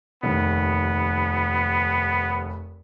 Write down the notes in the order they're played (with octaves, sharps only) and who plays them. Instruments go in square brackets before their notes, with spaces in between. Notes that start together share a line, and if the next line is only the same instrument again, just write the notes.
[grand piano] F1 D#2 [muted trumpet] B3